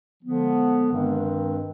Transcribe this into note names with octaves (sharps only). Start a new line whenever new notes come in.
D3 F3 G#3 B3
G2 D#3 G#3 C4